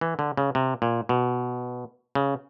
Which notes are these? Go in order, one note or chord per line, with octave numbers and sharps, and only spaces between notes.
E3
D3
C#3
C3
A#2
B2
C#3